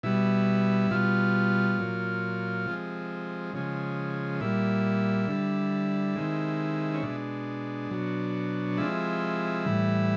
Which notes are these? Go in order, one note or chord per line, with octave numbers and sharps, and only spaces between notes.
B2 G3 E4
B2 G3 F4
A#2 F#3
C3 F3 G#3
C#3 F3 G#3
A#2 G3 E4
D3 G3
C3 D#3 G#3
C#4
B2 G#3 D4
B2 F#3
C3 F3 G#3 E4
A2 E3 G3